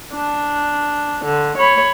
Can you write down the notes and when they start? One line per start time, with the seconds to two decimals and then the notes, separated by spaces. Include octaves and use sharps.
0.14 D4
1.25 D3
1.58 C#5 B5